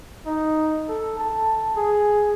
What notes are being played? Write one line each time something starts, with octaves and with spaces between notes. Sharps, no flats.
D#4
A4
A5
G#4